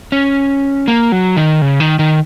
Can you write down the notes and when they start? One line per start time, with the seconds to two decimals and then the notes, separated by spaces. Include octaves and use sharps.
0.12 C#4
0.88 A#3
1.12 F#3
1.37 D#3
1.62 C#3
1.80 D#3
1.99 D#3